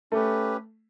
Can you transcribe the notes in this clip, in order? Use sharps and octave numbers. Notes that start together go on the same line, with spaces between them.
A3 C#4 G4 B4